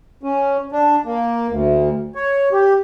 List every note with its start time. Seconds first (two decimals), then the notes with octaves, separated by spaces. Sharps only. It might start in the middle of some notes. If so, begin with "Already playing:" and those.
0.23 C#4
0.72 D4
1.05 A#3
1.48 D2
2.15 C#5
2.52 G4